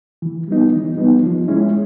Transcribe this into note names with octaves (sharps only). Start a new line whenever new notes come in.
E3
G3 B3 D#4
E3
G3 B3 D#4
F3
G#3 C#4 E4